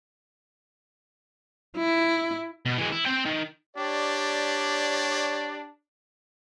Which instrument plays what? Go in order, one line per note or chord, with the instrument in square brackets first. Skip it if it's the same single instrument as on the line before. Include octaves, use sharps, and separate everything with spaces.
[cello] E4
[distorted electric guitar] B2
E3 G#3
E4
C4 G5
D#3
[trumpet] D4 [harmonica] G4 C#5 D5